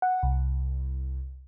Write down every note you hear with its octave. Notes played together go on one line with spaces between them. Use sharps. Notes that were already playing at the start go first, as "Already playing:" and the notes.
F#5
C2